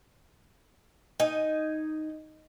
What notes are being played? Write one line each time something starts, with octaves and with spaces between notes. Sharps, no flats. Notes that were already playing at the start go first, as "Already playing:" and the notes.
D#4 G#5